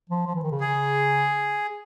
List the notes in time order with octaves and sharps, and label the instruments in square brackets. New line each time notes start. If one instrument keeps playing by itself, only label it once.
[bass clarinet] F3
F3
E3
D#3
C#3
[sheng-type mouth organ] G#4